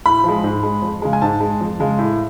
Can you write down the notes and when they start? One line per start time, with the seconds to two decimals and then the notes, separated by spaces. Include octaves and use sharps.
0.06 A2 B5
0.24 F3 G#3
0.44 G#2
0.63 G#3
0.82 F2
1.02 C#3 G#3
1.13 G#5
1.22 G#2 A5
1.40 G#3
1.61 F2
1.80 C#3 G#3
1.98 A2